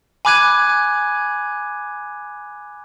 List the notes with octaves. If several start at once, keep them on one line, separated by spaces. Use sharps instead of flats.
G#5 B5 D6 F#6 G#6 D#7